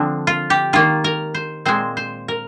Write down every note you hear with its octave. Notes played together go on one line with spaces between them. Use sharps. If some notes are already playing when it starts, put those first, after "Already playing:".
Already playing: D3 F3 C4 D4
F4
G4
D#3 A#3 F4
A#4
C5
A#2 G#3 C4 C5
C5
A#4